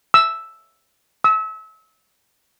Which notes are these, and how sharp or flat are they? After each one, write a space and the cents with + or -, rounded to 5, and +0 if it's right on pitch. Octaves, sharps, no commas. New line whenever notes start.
E6 +0
E6 -30